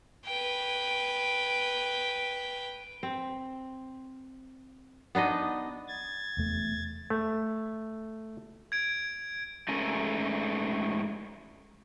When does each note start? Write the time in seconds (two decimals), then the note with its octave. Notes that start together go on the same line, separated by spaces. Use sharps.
0.26 B4 G5
3.03 C4
5.15 B3 D4 D#4 D#5
5.88 G#6 A6
6.37 F1 E2 A3
7.10 A3
8.72 G#6 D7
9.68 G#2 A3 C#4 A4 A#4 G#5